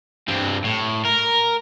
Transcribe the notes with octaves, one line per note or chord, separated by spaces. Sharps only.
G2 C4
A2
A#4